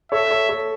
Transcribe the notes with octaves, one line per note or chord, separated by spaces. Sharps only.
A4 C#5 E5
A4 C#5
A4 C#5